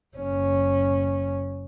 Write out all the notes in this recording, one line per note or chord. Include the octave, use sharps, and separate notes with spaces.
F#1 C#4